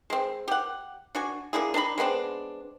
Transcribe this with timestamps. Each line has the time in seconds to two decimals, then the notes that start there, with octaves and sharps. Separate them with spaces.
0.10 G#3 C4
0.48 G4 F#5
1.15 D4 F#4 G#5
1.53 A#3 D4 E4 G#4
1.74 D4 D#4 A5 B5
1.98 G#3 B3 C4 D4